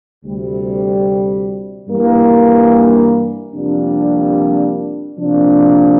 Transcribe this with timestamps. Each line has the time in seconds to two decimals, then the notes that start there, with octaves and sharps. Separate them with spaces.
0.23 D2 C3 G3
1.88 G2 E3 A#3
3.54 F2 C3 G3 A#3 D4
5.18 C3 F3 A#3 D4